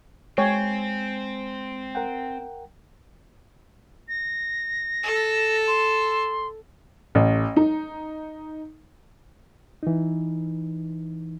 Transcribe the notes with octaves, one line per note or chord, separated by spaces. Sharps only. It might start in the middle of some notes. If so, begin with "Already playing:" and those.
G#3 C4 C#5 G5 G#5
A#4 F#5 G5
A#6
A4 E6
C6
A1
D#4
E3 D#4